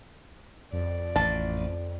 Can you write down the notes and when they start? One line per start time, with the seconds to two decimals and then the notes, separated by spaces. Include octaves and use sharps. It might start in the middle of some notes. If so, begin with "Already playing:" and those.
0.72 F2 D5
1.16 A1 A5